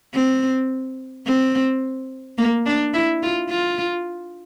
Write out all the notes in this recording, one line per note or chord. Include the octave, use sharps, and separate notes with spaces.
C4
C4
A#3
D4
E4
F4
F4